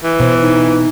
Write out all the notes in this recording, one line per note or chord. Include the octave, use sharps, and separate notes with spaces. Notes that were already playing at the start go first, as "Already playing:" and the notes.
E3
B2 C5
D#4